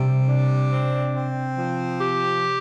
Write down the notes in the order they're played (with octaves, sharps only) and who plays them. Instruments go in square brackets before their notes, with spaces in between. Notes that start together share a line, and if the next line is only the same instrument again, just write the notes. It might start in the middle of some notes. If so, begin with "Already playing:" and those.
Already playing: [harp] C3 [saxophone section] G3
[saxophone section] D4
C4
C4
F3
G4